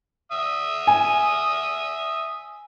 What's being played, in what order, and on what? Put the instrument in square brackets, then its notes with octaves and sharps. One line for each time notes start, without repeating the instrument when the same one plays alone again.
[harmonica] E5 D#6
[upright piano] G#5